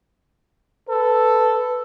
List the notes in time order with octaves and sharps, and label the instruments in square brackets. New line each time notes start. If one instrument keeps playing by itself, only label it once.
[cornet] A4 [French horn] B4